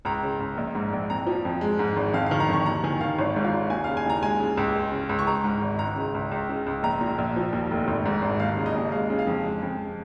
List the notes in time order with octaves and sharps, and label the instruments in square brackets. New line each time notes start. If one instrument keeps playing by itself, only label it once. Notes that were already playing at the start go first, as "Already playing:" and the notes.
[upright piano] C#2 A#5
C#3
C#2
A#1
G#2
A#1
F2 A#5
F3
F2
G#3
G#2
G#1
F2 F5
D#3 F5
A#5
F2 C#6
D#2 A#5
D#3 G#5
D#2 F5
G#1 C#5
G#2
F4
G#1
D#2 G#5
C#3 F5
G#5
D#2 A#5
G#3 G#5
C#3
C#2
G#3
C#3
C#2
C#6
G#3 A#5
G#2
G#1
C#2 A#5
C#3
C#2
C#2
C#3
C#2
A#1 A#5
A#2
A#1
F3
D#2
F1
G#1
G#2
G#1
D#2 F5
C#3
D#5
D#2
G#3 F5
C#3
F5
F2
G#3
F2